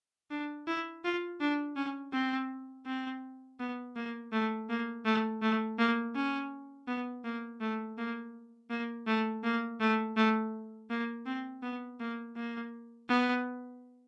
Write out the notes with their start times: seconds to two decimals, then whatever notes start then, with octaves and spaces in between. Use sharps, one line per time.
0.31 D4
0.67 E4
1.04 F4
1.41 D4
1.76 C#4
2.13 C4
2.86 C4
3.60 B3
3.96 A#3
4.32 A3
4.69 A#3
5.06 A3
5.42 A3
5.79 A#3
6.15 C#4
6.88 B3
7.24 A#3
7.61 A3
7.98 A#3
8.70 A#3
9.07 A3
9.43 A#3
9.80 A3
10.17 A3
10.90 A#3
11.26 C4
11.63 B3
12.00 A#3
12.36 A#3
13.09 B3